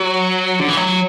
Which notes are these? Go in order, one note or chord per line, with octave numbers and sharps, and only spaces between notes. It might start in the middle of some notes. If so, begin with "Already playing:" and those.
Already playing: F#3
D3
E3
F#3